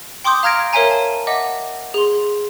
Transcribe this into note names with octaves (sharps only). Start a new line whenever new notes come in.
G5 C6 D6 D#6 G6
F5 A#5 F6 G#6 A#6 D7
A#4 C#5 E5 F5 G#5 A#5
A5
D#5 E5 F#5 D6
G#4 C6